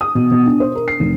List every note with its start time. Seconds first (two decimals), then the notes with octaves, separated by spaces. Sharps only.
0.01 D#6
0.15 B2
0.31 B2
0.46 D4
0.60 C5
0.75 A#4
0.88 C7
1.00 F1